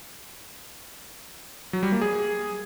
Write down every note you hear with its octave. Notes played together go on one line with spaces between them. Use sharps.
F#3
G3
A#3
G#4